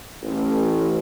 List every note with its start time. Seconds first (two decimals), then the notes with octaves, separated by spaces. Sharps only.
0.22 A1